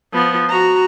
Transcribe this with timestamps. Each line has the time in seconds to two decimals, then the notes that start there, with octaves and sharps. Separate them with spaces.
0.13 F3 B3
0.49 F#4 A#5